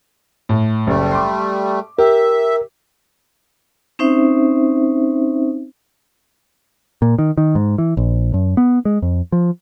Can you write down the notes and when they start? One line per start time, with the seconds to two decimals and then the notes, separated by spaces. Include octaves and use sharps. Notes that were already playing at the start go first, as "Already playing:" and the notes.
0.49 A2
0.87 F#1 G3 A3
1.11 C6 D6
1.99 G4 A#4 E5
3.99 C4 C#4 D#4 C5 E5
7.02 A#2
7.19 D#3
7.37 D#3
7.55 G#2
7.78 E3
7.97 A#1
8.34 F#2
8.57 B3
8.85 G#3
9.02 F2
9.32 F3